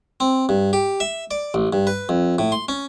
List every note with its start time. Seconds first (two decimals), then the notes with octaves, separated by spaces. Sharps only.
0.20 C4
0.49 G2
0.73 G4
1.00 E5
1.31 D5
1.54 A1
1.73 G2
1.87 B4
2.09 F2
2.39 A2
2.52 C6
2.68 C#4